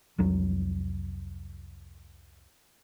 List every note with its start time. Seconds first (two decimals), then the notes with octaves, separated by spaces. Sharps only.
0.18 C2 F2 F#3